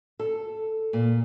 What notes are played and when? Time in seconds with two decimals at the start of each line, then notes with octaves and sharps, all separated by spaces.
0.19 A4
0.93 A#2